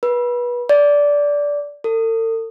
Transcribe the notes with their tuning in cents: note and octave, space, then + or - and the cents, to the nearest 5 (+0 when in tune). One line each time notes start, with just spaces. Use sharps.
B4 -25
D5 -15
A4 +45